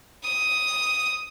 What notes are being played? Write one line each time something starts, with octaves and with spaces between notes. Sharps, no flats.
D#6